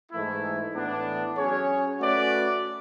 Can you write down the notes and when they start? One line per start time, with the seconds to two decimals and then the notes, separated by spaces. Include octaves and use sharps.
0.11 G#2 E3 A3 E4
0.74 A2 E3 B3 D4
1.36 F#3 C#4 G#4 C#5
1.98 A3 C#4 F#4 B4 D5